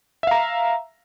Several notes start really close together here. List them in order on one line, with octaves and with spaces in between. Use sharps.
E5 F5 A#5